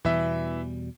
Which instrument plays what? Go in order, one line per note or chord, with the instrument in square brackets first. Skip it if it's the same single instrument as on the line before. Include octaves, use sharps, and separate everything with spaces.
[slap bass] E2 B2 G3 [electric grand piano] E3 E5